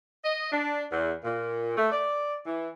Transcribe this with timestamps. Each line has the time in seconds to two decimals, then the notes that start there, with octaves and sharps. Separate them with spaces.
0.24 D#5
0.52 D4
0.90 E2
1.24 A#2
1.77 A3
1.92 D5
2.46 E3